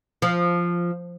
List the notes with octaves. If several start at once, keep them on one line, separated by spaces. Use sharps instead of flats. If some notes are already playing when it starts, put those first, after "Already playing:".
F3